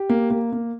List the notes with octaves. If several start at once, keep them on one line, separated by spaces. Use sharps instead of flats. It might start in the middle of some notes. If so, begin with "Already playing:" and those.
Already playing: G4
A#3
A#3
A#3